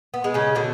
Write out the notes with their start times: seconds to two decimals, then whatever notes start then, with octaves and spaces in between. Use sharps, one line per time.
0.14 B3
0.24 G#3
0.34 C#3 C#4
0.55 B2 D3 D4